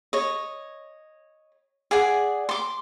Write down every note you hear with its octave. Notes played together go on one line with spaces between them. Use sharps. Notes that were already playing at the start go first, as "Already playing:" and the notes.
C#5 D#5
G#4 D5 F#5 G#5
C6 D6